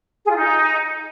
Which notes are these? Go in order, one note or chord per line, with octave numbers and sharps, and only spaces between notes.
G#4
F4
D#4